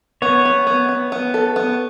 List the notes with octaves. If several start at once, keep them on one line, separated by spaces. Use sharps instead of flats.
B3 C#5
B3
B3
B3
B3
A4
B3